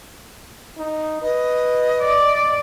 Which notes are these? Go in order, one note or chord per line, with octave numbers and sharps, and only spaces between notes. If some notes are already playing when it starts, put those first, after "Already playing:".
D#4
B4 D#5
D5